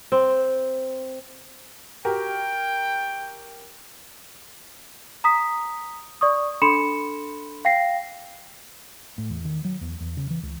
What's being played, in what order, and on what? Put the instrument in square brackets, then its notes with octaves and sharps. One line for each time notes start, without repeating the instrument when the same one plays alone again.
[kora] C4
[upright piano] F#4 G4 A#4 [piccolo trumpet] G5
[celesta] A#5 D#6 B6
D5 C#6 D#6
D4 A4 B5 C6 C#7 E7
F5 G5 A#6 C7
[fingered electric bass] A2
E2
D#3
F#3
E2
E2
C#3
E3
C#2